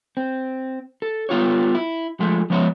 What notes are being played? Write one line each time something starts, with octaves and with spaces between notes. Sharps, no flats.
C4
A4
G3 B3 F4 G4 C#5
E4
F3 G#3 A3 F4
F3 G#3 B3 C#5 E5